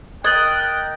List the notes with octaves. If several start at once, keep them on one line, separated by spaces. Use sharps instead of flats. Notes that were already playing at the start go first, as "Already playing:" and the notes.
A#4 D#5 G5 F#6 G#6 A6 F#7